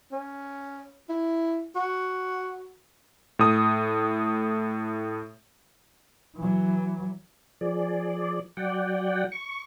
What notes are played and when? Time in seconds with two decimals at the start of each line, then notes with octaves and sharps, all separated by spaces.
0.12 C#4
1.09 E4
1.75 F#4
3.39 A2 D#6
6.37 E3 F#3
7.61 F3 G#4 D5
8.57 F#3 D5 F#5 G5
9.32 C#6